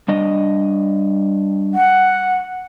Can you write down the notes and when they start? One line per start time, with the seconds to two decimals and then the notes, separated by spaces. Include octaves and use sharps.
0.08 G3 D4 D#5
1.74 F#5